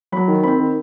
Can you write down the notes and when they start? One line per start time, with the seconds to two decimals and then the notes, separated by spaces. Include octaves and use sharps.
0.12 F#3 B5
0.28 D#3
0.43 C4 B5
0.59 D#3